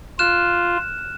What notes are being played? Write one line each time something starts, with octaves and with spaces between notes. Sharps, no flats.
F4 F6 F#6 E7